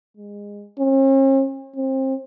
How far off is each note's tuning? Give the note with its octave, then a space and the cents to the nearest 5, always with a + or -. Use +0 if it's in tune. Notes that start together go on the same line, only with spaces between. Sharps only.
G#3 -25
C#4 -45
C4 +25